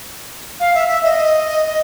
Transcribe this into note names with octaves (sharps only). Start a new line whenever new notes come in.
F5
E5
E5
D#5